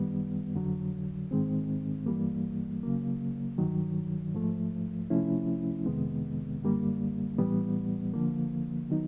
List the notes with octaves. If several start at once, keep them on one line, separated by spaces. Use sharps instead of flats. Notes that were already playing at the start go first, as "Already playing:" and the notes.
Already playing: F#2 D#3 G3 B3
F2 D3 F#3
G#2 D#3 G#3 C4
G2 E3 G3 A#3
C#3 F#3 A#3
G2 D#3 F#3
G#2 F3 A3
C3 F3 A3 C#4 E4
F2 C3 D#3 G#3 B3
F#2 D3 G3 A#3
A2 E3 G3 B3
D3 F3 A#3
D#3 F#3 B3 D#4